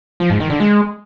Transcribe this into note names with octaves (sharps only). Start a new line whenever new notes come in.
F3
G#2
D#3
D3
G#3